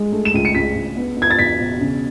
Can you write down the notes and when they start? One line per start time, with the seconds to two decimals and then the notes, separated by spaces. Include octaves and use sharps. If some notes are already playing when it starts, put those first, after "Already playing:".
Already playing: G#3
0.12 A3
0.25 E7
0.34 C#2 D#7
0.45 C#7
0.55 C#2 B6
0.75 C#2
0.97 B3
1.17 B3
1.22 G#6
1.30 A6
1.39 E2 B6
1.59 B2
1.81 C#3